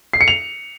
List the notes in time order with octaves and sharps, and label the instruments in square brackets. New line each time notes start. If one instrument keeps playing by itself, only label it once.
[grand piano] C7
C#7
F7